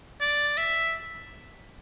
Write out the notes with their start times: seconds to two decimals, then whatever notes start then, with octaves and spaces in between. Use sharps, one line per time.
0.21 D5
0.57 E5